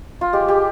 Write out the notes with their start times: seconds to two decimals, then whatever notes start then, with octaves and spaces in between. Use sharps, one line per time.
0.21 F4
0.33 G#3 G4
0.48 G#3 G4